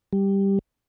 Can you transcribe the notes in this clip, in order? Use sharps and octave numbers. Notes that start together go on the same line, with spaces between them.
G3